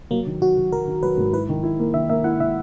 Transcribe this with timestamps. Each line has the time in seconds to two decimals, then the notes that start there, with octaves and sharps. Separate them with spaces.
0.11 F#3 A#3
0.26 D#3
0.41 F#3 F#4
0.57 F#3
0.72 F#3 A#4
0.87 D#3
1.03 F#3 B4
1.18 G#2
1.32 E4 B4
1.49 D#3
1.63 E4
1.79 A#3
1.94 D#3 E5
2.09 A#3 E5
2.24 E4 F#5
2.40 D#3 E5